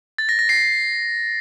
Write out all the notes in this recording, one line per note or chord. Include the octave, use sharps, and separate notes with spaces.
A6
A#6
A#6
C7